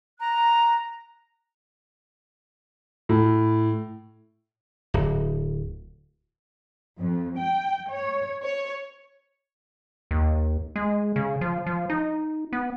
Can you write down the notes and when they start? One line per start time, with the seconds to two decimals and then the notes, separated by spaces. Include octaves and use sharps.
0.19 A#5 F#6
3.09 A2
4.94 D1
6.98 F2
7.38 G5
7.90 C#5
8.42 C#5
10.11 D#2
10.76 G#3
11.16 C#3
11.41 F3
11.67 F3
11.90 D#4
12.53 B3